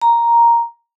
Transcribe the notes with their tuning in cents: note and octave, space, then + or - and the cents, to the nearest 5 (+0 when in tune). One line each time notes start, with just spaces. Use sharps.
A#5 +5